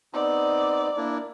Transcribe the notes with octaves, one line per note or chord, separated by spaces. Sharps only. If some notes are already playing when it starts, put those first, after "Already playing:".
B3 C4 D#4 D5
A#3 D4 E4